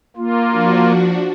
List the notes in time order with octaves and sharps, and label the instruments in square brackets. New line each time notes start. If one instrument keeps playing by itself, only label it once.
[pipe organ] A#3 F4
[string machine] F3 D4 F#4